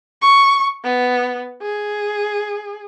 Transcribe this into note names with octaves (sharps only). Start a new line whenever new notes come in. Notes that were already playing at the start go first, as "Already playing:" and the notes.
C#6
B3
G#4